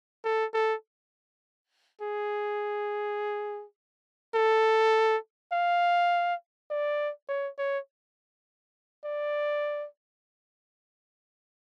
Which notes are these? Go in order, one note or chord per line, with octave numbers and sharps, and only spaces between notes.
A4
A4
G#4
A4
F5
D5
C#5
C#5
D5